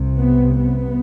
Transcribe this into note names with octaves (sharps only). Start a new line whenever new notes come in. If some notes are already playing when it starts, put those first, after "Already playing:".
Already playing: C2 C3
B3
B3